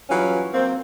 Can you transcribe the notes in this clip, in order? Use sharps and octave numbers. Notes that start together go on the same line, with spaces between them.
E3 F#3 G3 C#4 F4
F#3 A#3 C4